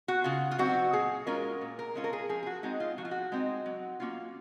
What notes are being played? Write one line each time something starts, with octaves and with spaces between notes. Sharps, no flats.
F#4
C#3 F4
F4
F#3 C4 D#4 F#4
A#2 G#4
G#3 C#4 F4 A#4
A#2
A#4
G#3 C#4 F4
A#4
G#4
F3 G#4
G#4
F#4
G#3 C4 D#4 F#4
F4
F3 F#4
F4
F#4
G#3 C4 D#4
F#3
A#3 C#4 F4